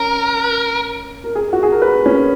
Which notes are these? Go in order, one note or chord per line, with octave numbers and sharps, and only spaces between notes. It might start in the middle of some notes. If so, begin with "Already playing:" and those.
Already playing: C#4 A#4
A#4
G#4
F#4
G#4
A#4
B4
C#4